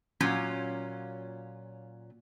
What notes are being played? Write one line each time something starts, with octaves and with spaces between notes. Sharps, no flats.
A#2 F#3 C#4 F4